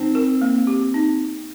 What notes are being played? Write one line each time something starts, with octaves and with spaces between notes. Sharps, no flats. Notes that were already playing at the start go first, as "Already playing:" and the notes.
Already playing: C4 D#4
A#4
A#3
G4
D#4